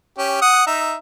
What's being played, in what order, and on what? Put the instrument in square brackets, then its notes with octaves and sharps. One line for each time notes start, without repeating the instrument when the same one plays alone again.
[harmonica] C#4 G4
F#5 D#6
D#4 E5